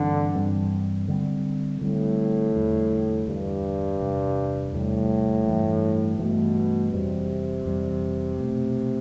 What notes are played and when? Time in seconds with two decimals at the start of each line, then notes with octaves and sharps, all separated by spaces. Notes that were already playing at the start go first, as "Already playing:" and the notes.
Already playing: G2 D3 E3 G3 C4
0.35 G2 E3 G3 C4
1.08 D3 G3 C4
1.81 A2 D3 G3 C4
2.54 E2 D3 G3
3.26 E2 G2 D3 G3
4.00 E2 C3 G3
4.72 E2 A2 C3 G3
5.46 G2 E3 A3
6.19 G2 B2 E3 A3
6.92 F2 C3 E3 G3
7.65 F2 E3 G3
8.38 B2 A3 C4